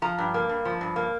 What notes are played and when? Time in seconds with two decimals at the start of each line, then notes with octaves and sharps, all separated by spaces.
0.02 F3 A#5
0.18 G2
0.34 A#3
0.49 G2
0.65 F3
0.81 G2
0.96 A#3